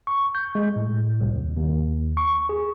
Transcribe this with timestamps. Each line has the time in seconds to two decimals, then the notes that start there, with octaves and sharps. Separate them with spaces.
0.07 C#6
0.35 G6
0.55 G#3
0.76 A2
1.21 C2
1.32 D#2
1.57 D#2
2.17 C#6
2.49 G#4